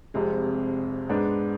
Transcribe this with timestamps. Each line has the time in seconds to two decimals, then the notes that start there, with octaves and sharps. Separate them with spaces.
0.14 F1 F2 C3 G#3
1.09 G#2 G#3 B3 D4